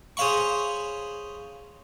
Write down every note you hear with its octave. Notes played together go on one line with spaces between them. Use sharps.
G#4 C5 C#5 F5 B5 C#6